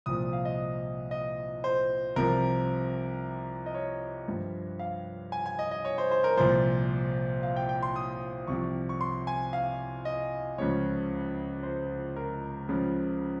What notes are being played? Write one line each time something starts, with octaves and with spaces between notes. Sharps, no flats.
C2 A#2 F3 D#6
F5
D#5
D#5
C5
C2 C3 F3 A#4
D#5
C#5
G2 F3
F5
G#5
G#5
D#5
D#5
C#5
C5
C5
A#4
C2 A#2 F3 C5
F5
G5
G5
C6
D#6
C2 C3 F3 C#6
C#6
C6
G#5
F5
D#5
C#2 C#3 F3 C#5
C5
A#4
C#2 C#3 F3